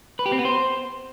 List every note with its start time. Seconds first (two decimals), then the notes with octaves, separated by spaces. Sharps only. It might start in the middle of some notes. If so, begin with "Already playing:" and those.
0.19 B4
0.26 G4
0.32 C4
0.39 B3
0.45 C5